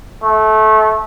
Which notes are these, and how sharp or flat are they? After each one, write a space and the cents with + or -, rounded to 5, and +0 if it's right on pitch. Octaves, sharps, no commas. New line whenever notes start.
A3 -20